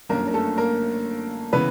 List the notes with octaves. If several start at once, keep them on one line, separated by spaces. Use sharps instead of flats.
G1 F#2 D3 A#3 A#4
A#4
A3 A4
A#3 A#4
C#3 E3 B3 B4